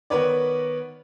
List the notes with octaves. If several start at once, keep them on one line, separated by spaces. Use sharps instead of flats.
D#3 B3 A#4 B4 C#5 D5